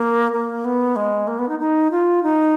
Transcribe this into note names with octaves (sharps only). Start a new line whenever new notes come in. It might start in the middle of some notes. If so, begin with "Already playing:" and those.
Already playing: A#3
A#3
B3
G#3
A#3
B3
D#4
D#4
F4
D#4